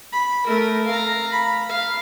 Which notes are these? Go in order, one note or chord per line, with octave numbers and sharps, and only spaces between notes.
B5
A3 A#4
F5 A#5
B5
F5